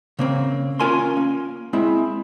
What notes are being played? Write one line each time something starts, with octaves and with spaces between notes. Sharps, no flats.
C#3 A#3 C4
C#4 F4 A#4 G#5 A#5 C6
A#3
G#3 C4 E4